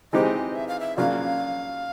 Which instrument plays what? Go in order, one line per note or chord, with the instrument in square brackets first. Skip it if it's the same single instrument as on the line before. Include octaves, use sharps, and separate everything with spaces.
[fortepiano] E3 G#3 C4 D#4 G4 [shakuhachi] D#5
[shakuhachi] E5
F5
E5
[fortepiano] C#3 F#3 A#3 D4 F4 [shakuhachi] F5